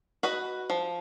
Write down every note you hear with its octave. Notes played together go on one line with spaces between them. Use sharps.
F#4 B4 D#5
F3